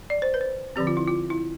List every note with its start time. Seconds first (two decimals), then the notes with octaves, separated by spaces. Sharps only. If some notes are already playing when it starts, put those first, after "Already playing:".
0.10 D5
0.22 C5
0.34 B4
0.41 C5
0.76 D3 F3 C4 G4
0.87 F4
0.97 E4
1.07 F4
1.30 E4